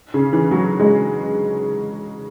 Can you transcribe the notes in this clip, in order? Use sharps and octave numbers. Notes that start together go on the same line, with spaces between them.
C#3
E3
F#3
G#3